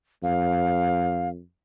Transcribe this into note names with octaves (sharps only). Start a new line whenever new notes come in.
F2 F5